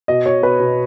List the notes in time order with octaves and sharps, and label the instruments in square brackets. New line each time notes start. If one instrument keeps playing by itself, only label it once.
[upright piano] B2 D#5
B2 C#5
B2 B4
B2